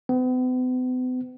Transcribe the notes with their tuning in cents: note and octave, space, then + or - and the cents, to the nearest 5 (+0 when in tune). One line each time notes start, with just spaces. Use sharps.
B3 +45